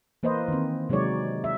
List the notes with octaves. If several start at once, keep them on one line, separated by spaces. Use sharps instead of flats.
E3 A#3 B4 C5 D#5
D#3 C4
C3 F#3 G#3 D#4 C#5 D5
E5